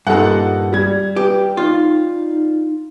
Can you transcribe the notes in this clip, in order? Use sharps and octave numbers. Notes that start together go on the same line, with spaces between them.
G2 A#2 D#4 A4 F#5
G3 G#6
G4 B4
D#4 F4